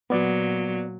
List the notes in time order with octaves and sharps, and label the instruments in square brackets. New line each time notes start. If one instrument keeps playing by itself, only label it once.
[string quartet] A#2 F#3 [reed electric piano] B3 D5